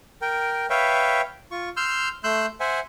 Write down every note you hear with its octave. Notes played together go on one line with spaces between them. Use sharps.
A#4 G5
B4 C#5 E5 F5 G5
F4 C#6
C6 E6 F6 G6
A3 C6 E6 F#6 G6
C5 E5 F#5 G#5